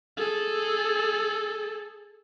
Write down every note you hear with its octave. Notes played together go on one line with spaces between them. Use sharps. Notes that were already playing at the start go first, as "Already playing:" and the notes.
G#4 A4